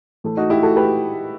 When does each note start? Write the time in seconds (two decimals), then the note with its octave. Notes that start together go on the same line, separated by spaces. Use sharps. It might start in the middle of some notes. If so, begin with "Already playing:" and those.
0.24 A2 E3 A3
0.37 D#4 F#4
0.50 E4 G4
0.63 F#4 A4
0.76 G4 B4